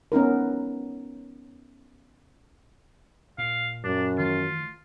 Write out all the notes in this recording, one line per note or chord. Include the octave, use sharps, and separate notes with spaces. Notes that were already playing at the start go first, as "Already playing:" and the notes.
B3 C#4 D#4 A#4
A#2 F5
F#2 D4
D#3 E3 A3 F4